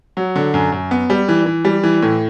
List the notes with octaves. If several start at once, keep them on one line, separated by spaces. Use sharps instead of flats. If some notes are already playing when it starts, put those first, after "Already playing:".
F#3
D3
F#2
F#2
B3
G3
E3
E3
G3
E3
A2